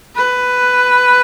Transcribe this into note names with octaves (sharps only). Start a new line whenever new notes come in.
B4